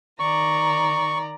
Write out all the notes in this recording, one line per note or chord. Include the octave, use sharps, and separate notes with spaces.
D#3 D5 A#5 C#6